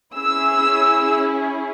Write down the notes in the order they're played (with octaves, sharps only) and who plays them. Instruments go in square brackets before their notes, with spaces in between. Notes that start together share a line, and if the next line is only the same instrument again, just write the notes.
[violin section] C#4 E4 G#4 E6